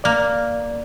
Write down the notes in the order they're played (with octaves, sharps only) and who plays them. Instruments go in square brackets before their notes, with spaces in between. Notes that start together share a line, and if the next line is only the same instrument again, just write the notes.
[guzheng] A#3 [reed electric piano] D5